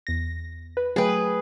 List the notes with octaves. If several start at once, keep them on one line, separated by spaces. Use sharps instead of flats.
E2 A#6
B4
F#3 A3 G#4 B4 G5